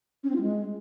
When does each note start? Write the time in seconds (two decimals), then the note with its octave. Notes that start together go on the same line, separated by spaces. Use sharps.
0.24 C#4
0.30 C4
0.35 F4
0.41 G#3